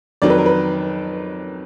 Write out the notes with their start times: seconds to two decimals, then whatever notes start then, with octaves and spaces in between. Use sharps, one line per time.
0.22 F2 D#3 F#3 D5
0.30 B4
0.38 A#4
0.46 B4